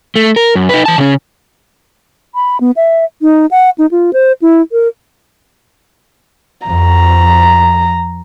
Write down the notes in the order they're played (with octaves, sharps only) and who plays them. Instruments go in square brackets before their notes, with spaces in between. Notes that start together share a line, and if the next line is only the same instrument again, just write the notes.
[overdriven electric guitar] A3
A#4
F#2
D#4 B4
E3 A5
C#3 C#4
[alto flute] B5
B3
E5
D#4
F#5
D#4
F4
C5
E4
A#4
[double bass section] F2 [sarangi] A#5